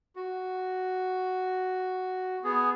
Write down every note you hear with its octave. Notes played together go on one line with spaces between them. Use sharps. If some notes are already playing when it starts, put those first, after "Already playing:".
F#4
B3 G#4